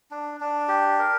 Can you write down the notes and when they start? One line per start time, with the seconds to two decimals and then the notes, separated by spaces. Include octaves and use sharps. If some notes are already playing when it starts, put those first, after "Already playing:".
0.11 D4
0.40 D4
0.68 G4
0.99 A#4